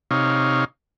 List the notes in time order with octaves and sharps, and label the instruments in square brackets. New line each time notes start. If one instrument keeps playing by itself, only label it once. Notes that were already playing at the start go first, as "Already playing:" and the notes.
[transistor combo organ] C3 D#4 C#5 F5